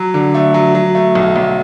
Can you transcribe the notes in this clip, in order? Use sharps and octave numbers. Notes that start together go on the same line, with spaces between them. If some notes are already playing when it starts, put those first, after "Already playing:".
Already playing: F#3
D3
A3
F#3
F#3
A3
B1
B1